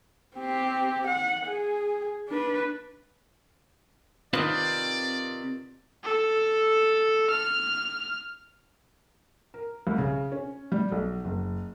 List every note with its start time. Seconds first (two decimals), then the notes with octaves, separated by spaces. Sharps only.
0.37 C4 G4
1.07 F#5
1.46 G#4
2.29 D4 B4
4.33 C3 D#3 C4 F4 B4 D5
6.04 A4
7.30 F6
9.54 A#4
9.87 C2
9.98 C#3
10.32 C#4
10.72 G3
10.92 B1
11.24 F#1